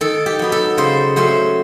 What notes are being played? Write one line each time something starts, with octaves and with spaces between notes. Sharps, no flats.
D#3 A4
G4
F#3 B3 D#4
A4
C#3 C5
F#3 A3 C#4 C5